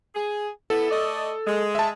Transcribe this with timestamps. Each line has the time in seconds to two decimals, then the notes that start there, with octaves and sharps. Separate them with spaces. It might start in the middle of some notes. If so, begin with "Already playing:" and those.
0.15 G#4
0.70 B3 E4 A4
0.90 A3 D5 D#5
1.47 G#3
1.75 E5 A5